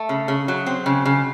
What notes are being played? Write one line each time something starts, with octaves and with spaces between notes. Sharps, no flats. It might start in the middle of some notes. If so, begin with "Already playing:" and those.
Already playing: A3
C#3
C#3
F#3
C4
C#3
C#3